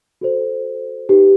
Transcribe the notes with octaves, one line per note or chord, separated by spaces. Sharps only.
F#4 A4 C5
D#4 G4 B4